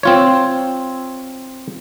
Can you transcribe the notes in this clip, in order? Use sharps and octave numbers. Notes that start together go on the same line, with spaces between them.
C4 F4 C#5